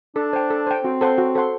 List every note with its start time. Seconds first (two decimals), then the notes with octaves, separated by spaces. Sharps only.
0.16 D4 A4
0.33 C5 G5
0.50 A4
0.67 C5 G5
0.84 C4 F#4
1.01 A4 C5 F#5 C6
1.18 F#4
1.35 A4 C5 F#5 C6